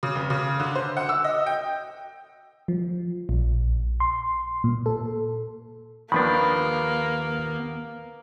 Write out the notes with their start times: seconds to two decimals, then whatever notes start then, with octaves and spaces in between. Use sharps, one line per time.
0.03 C#3
0.15 F1
0.30 C#3
0.60 D3
0.75 C5
0.97 F#5
1.09 E6
1.24 D#5
1.46 G5
2.68 F3
3.29 A#1
4.00 C6
4.64 A#2
4.86 A4
6.12 D#2 D#3 F3 A#3 B3 D4 B5